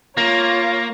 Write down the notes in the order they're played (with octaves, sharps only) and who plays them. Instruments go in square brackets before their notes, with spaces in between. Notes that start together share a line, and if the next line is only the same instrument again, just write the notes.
[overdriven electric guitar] A#3 [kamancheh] F4 C#5